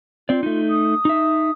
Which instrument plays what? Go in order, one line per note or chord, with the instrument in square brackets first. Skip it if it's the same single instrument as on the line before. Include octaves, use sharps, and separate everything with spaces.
[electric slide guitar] C4 D5 [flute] F4
[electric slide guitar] A3 D#4
[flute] D#6
[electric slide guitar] D#4 E5